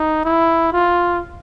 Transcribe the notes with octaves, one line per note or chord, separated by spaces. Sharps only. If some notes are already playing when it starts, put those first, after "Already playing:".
Already playing: D#4
E4
F4